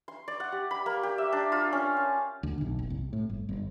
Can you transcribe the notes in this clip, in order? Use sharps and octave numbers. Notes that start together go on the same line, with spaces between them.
C6
D5
F#5
G4
B5
A#3
G4
E5
D4
F4
C#4
A5
D2
B1
F#1
C2
A2
G1
G1